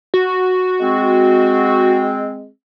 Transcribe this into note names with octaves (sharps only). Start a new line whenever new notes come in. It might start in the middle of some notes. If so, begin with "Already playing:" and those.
F#4
G#3 C4